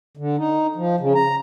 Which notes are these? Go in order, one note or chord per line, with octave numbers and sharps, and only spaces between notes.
D3
D#4
F3
C#3
A#5